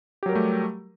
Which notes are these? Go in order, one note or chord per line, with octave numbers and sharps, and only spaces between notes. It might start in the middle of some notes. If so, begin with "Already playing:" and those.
F#3 G3 A3 G4 A#4